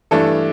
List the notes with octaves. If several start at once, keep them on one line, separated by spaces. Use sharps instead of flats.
G2 E3 A3 D4 A4